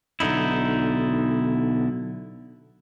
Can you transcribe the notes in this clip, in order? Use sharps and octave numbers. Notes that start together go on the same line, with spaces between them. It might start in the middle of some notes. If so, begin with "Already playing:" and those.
B1 D3 D#4 E4